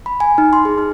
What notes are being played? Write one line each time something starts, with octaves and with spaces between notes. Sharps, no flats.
B5
G#5
D#4
C6
G#4
D#4